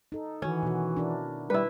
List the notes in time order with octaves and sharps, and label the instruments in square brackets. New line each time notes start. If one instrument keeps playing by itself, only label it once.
[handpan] D#4 A4
[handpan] D#3 F#4 [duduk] E3 [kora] C#4
[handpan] B2 F#4
D4 E4 A#4
[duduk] G3 [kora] E4 B4